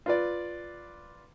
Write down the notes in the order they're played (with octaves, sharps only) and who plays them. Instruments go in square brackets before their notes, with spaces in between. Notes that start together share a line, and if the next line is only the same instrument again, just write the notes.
[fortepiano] F4 B4 D5